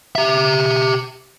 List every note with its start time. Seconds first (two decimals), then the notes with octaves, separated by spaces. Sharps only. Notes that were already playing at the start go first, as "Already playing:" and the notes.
0.15 G4 E5